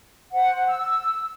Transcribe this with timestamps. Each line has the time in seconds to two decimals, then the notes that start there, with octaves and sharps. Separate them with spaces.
0.33 C5 F#5
0.67 E6